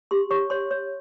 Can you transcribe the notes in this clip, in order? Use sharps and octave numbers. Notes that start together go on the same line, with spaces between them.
G4 C6
C#5 C#6
C#5 C6
C#5